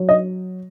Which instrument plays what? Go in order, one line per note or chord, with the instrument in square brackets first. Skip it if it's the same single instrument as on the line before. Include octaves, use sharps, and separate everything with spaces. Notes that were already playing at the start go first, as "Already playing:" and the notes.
Already playing: [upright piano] F#3
D#5